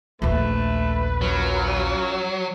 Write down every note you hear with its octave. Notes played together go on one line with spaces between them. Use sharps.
A#1 D#2 A3 B4
F#2 F#3 F4